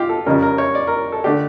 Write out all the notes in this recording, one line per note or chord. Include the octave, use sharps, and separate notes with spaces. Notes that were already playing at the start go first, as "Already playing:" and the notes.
Already playing: F4 G4
A4
F2 C#3 G3 C#4 A#4
A#4
C#5
D5
A#4
A4
D3 A3 D4 G4